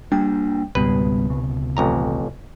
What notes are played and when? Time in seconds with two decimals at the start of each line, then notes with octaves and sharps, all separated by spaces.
0.12 G3 A#3 D4 G5
0.75 C#2 G#2 B2 G3 B3 B4
1.30 C3
1.77 A1 F2 A#5